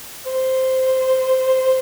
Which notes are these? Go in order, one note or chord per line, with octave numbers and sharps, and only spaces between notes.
C5